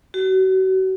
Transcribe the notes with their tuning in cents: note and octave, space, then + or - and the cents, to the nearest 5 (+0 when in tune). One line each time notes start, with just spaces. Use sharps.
F#4 +35